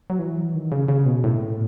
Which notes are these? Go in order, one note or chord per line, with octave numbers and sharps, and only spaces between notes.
F#3
E3
D#3
C#3
C#3
B2
A2